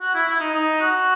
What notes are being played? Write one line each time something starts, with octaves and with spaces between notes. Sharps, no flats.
F#4
E4
E4
D#4
D#4
F#4